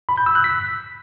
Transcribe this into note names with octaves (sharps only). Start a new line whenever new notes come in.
B5
G6
E6
F#6
B6